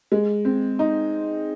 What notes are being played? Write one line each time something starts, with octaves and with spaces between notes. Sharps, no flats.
G#3
C4
D#4